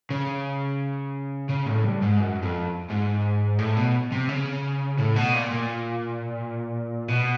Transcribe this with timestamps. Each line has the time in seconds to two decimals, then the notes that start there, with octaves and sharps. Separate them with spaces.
0.10 C#3
1.50 C#3
1.67 A2
1.85 G2
2.02 G#2
2.20 F#2
2.42 F2
2.90 G#2
3.59 A2
3.77 B2
4.12 C3
4.28 C#3
4.98 A2
5.16 B2
5.33 A#2
5.51 A#2
7.08 B2